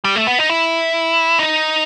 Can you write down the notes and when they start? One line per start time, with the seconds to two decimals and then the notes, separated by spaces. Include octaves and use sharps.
0.04 G3
0.16 A3
0.27 B3
0.39 D#4
0.50 E4
1.39 D#4